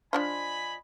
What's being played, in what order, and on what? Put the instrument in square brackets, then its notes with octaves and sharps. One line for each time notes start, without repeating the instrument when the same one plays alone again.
[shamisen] F3 D4 F4 [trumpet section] D#5 G#5 B5